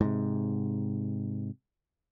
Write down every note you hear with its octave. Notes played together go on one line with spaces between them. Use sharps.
G#2 C3